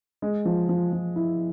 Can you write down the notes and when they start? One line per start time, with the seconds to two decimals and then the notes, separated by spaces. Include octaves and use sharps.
0.22 G#3
0.45 F3
0.69 F3
0.93 F3
1.16 E4